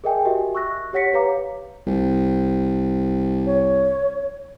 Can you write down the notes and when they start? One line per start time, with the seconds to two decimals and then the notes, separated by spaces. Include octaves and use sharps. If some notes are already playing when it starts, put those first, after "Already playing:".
0.04 G#4 A#4 D#5 E5 G5 G#5
0.25 F#4 G4 A#4 D#5 E5 G#5
0.55 C#6 E6 F#6 A#6
0.93 G4 C#5 F#5 A#6 B6 C#7
1.13 G4 B4 C#5 F5 A#5 D6
1.86 C2
3.46 C#5